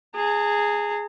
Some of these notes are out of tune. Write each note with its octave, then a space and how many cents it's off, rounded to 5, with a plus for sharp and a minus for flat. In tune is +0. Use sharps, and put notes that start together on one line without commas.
G#4 +0 A#5 -45